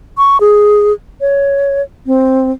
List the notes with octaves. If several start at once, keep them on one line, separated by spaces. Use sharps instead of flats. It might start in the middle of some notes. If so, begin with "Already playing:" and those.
C#6
G#4
C#5
C4